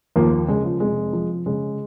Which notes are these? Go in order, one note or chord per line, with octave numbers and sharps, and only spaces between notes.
D#2 F3 A#3
F3
C#3 G#3
F3
F1 G#3
F3
C#3 G#3